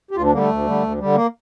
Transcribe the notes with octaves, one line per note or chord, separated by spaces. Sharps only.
G4
D2 F4
D4
D3 G3 A#3
A3
D2
D3 G3
D2
D3 G3
A#3